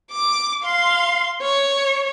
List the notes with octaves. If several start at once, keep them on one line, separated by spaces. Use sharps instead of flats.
D6
F5 C6
C#5